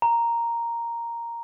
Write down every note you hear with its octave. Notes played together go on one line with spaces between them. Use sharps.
A#5